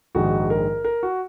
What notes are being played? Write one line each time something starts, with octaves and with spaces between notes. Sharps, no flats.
A#1 G#2 D#3 F#4
A#4
A#4
F#4